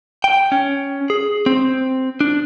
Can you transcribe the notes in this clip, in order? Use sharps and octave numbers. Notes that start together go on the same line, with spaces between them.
G5
C#4
G#4
C4
D4